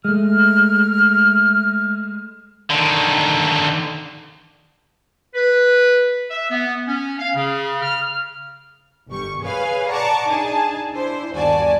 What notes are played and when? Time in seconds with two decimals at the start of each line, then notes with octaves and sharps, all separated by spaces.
0.05 G#3 A3 F6
2.71 D3 D#3
5.35 B4
6.31 E5
6.51 B3
6.87 C#4
7.19 F5
7.36 C#3
7.83 F6
9.09 G1 G3 C#6
9.41 G#4 B4 C#5 F5 G#5
9.89 D5 F#5 A5 A#5 C#6 D6
10.29 D4 D#4 G#4 G#5 A5
10.93 D4 E4 C5
11.33 G1 D#2 F#4 D5 G#5 A5